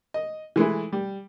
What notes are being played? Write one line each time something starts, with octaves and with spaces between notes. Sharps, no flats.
D#5
E3 G#3 A3 E4
G3